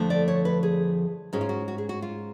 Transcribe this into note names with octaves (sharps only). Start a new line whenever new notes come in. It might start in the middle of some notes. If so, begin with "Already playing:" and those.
Already playing: F2 D3 F3 A3
D5
C#5
B4
G#4
G#2 G#3 C#4 F#4
F4
F#4
F#4
G#4
F#4
F4